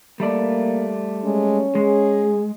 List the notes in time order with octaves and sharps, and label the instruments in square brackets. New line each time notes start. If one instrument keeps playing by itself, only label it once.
[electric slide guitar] G3 A3 D5 [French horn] A#3
[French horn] G#3 [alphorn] C#4
[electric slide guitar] G#3 [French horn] G#4